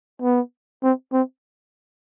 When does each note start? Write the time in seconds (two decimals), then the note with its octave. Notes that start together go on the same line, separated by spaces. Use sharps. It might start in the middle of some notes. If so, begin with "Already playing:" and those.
0.23 B3
0.83 C4
1.13 C4